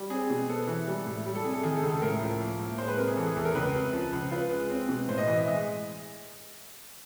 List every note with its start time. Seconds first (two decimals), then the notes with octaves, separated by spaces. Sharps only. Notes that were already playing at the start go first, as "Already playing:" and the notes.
Already playing: G3
0.10 C4 G#4
0.30 B2
0.49 B3 A4
0.67 E3
0.88 G3
1.06 A2
1.26 G3
1.35 A4
1.44 C3 G#4
1.54 A4
1.63 D#3 G#4
1.76 A4
1.83 C#2
1.89 A4
2.02 A2 A#4
2.21 F3
2.41 A#3
2.60 A2
2.78 G#3 C5
2.88 B4
2.97 C3 A#4
3.08 G#4
3.17 E3 A4
3.27 G#4
3.36 E2 A4
3.45 A#4
3.55 C#2 B4
3.74 C3
3.93 F3
4.12 C#2
4.31 F4 B4
4.51 G#3
4.70 C4
4.89 B2
5.08 A2 C5
5.18 D#5
5.28 E3 D#5
5.37 E5
5.46 G#3 D#5